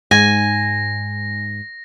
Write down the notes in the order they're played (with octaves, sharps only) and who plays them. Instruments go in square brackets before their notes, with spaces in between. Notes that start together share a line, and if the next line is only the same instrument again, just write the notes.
[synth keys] G#2 [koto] G#5 [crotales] A#6